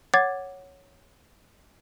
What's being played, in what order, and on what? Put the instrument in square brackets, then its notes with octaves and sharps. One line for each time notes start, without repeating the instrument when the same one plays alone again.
[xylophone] C#5 F#5 D6 G#6 A6